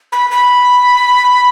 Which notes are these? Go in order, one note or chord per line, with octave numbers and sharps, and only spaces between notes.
B5
B5